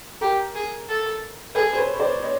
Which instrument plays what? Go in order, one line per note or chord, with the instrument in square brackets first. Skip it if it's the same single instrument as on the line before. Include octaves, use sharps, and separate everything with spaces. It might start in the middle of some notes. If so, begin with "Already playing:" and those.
[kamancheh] G4 [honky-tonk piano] A#4
[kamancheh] G#4
A4
[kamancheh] G#4 [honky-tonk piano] A4 B4
[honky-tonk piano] C5
B4 C#5
C#5
C5 D5
C#5 D#5